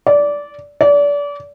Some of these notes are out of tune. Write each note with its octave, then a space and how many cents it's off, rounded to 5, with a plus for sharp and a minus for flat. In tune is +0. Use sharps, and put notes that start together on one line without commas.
D5 -15
D5 -30